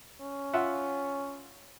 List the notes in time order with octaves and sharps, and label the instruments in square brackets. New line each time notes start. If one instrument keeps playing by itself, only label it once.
[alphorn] C#4
[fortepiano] F4 E5 F#5